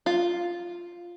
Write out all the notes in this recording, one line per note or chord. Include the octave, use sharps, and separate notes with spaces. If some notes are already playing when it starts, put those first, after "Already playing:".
F4